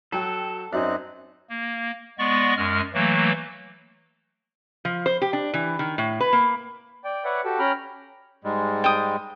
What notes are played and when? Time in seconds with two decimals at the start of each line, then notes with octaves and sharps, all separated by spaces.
0.13 F#3 F#4 A4 G5
0.73 F#2 C4 C#4 D#4 F#4 D5 F#6
1.50 A#3
2.18 G#3 B3 D5 D#5 C#6
2.57 F#2 G#3 F6
2.94 E3 F#3 A3 A#3
4.85 F3
5.06 C5
5.22 G4
5.33 D4
5.54 E3
5.79 D#3
5.98 A2
6.20 B4
6.33 A#3
7.04 D5 G5
7.25 B4 C#5 D5 E5 F#5
7.44 F#4 G4 A4
7.59 C#4 G5 A#5 B5 F6
8.44 G#2 G3 G#3
8.84 G5 D#6